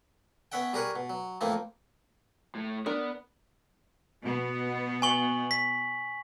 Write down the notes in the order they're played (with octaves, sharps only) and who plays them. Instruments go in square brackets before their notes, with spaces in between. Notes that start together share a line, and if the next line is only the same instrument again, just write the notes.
[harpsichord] B3 C#4 E5 F#5 G5
G3 G#4 A#4 B4 C#5
B2
F#3
A2 E3 F3 A#3 C4 D#4
[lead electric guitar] A2 A3
[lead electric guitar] B3 [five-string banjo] D4 A#4
[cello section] B2 B3
[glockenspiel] G#5 C#6 F#7
B6